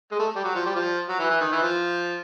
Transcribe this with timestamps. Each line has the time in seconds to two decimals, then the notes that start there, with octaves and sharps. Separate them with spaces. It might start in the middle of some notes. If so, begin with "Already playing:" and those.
0.12 G#3
0.19 A3
0.36 G3
0.44 F#3
0.55 F3
0.66 G3
0.76 F3
1.09 F#3
1.19 E3
1.31 E3
1.41 D#3
1.52 E3
1.63 F3